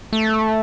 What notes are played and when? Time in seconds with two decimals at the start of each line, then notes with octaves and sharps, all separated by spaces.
0.13 A3